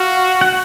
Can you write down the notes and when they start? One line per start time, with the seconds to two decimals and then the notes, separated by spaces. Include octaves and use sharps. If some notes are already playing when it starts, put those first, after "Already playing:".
Already playing: F#4 F5
0.41 F#5